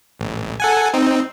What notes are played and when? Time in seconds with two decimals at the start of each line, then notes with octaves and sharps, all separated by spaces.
0.20 A1
0.60 A4 F#5 G#5
0.94 C4 D#4